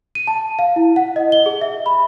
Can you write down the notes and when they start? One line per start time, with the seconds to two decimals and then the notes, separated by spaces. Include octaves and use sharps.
0.15 D#7
0.27 A5
0.59 F5
0.76 E4
0.96 F#5
1.16 D#5
1.32 G7
1.46 G#4
1.61 E5
1.86 B5